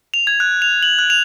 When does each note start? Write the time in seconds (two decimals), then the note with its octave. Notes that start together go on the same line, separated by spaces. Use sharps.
0.14 F7
0.27 G#6
0.40 F#6
0.62 F7
0.83 F#7
0.99 F#6
1.10 F7